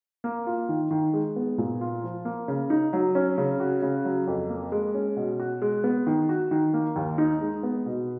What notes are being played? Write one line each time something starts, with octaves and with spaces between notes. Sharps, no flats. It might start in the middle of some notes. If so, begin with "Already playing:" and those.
A#3
F4
D#3
D#3
G#3
B3
A#2
F4
F3
A#3
C#3
D#4
F#3
C#4
C#3
F#4
C#3
F#3
F2
A#3
G#3
C#4
B2
F#4
G#3
B3
D#3
F#4
D#3
A#3
D#2
D#4
G#3
B3
B2